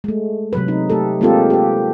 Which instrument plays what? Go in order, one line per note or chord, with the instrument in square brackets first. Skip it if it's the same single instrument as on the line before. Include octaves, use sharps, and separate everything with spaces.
[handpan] G#3 A3
C3 F#3 B4
D#4
A3 G4 A4
G#3 A#3 C4 F4 G4 A4
G4 B4